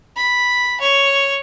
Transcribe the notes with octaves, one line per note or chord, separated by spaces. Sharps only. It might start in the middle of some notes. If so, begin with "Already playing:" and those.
B5
C#5